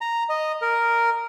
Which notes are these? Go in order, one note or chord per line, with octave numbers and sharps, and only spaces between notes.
A#5
D#5
A#4